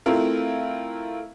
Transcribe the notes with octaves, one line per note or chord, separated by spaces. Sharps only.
A3 C4 E4 F4 A#4